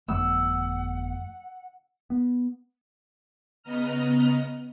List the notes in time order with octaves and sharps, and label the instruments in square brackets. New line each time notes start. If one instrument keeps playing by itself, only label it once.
[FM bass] G1 [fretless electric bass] F2 F3 A3 [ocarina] F#5 [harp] E6
[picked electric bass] B3
[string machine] C#3 B3 D#5 A#5 F6